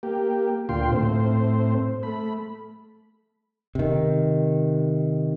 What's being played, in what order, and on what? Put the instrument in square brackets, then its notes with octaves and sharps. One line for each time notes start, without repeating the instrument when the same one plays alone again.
[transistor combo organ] A#3 G4
D2 A#2 F4 G5 C6
A2 C4 C5
A3 B5
[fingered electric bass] C3 D#3